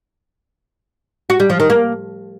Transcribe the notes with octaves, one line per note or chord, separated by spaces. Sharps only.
F#4
G3
F3
D#3
A#3